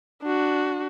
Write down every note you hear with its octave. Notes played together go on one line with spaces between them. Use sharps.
D4 F#4